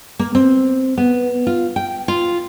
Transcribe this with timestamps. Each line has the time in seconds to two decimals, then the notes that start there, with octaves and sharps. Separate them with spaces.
0.19 A#3
0.35 C4
0.98 B3
1.47 F4
1.76 G5
2.08 F4